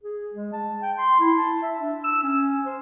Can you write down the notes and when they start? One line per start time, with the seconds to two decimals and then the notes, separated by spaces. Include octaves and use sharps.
0.04 G#4
0.34 G#3
0.53 A5
0.82 G5
0.98 C6
1.20 E4
1.37 A5
1.63 E5
1.80 D4
2.04 E6
2.23 C#4
2.66 C5